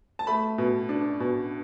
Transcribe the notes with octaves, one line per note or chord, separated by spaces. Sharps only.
A5
A3 B5
B2
D4
B2